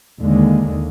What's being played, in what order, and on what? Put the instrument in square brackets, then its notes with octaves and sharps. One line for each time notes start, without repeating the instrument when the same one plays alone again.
[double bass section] D#2 D3 G#3